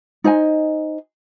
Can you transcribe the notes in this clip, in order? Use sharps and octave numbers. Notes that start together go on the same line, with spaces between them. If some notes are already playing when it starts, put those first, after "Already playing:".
D#4 C5 D#5 G#5